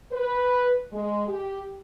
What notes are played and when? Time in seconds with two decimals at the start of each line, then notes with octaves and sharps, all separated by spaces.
0.12 B4
0.92 G#3
1.28 G4